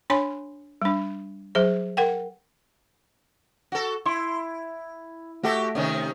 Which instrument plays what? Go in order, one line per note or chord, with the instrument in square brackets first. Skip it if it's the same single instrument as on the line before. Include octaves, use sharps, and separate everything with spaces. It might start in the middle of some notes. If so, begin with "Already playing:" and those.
[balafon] D4 C#5 G#5 C6
G3 D4
F#3 G#4 C5
A#4 F#5 G5
[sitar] F#4 A4
[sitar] E4 [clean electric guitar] C6
[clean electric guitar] A3 E5 [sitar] F#4 G4 A4
[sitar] C3 D#3 C#4